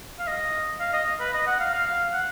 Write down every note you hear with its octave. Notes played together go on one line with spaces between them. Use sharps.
F5
D#5
F5
D#5
B4
D#5
F#5
F5
F5
F5
F#5